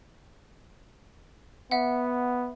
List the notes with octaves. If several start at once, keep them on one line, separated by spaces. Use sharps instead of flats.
B3 E5 F#5